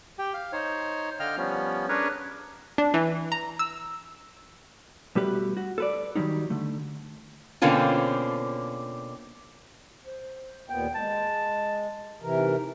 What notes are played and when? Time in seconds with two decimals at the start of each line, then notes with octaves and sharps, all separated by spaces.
0.19 G4 G5
0.34 F5
0.53 D#4 C5 C#5
1.20 D3 D#5 F5 G5 F6
1.37 F3 G3 B3 C#4
1.89 C#4 D4 G#4 A#4 B4 C#5
2.78 D4
2.94 E3
3.32 A#5
3.59 E6
5.15 B2 G3 A3 G4 B4
5.57 F#4
5.78 A4 B4 D5
6.15 D#3 E3 F#3 G3 D#4
6.50 D3 A3
7.62 B2 D3 A#3 C4 C#4 F4
10.05 C5
10.69 D#2 A#2 B3 G5
10.95 G#3 A5
12.22 C3 E3 A#4
12.37 D#4